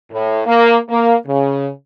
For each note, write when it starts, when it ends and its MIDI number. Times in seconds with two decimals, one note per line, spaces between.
0.12 0.40 45
0.46 0.76 58
0.89 1.15 58
1.27 1.68 49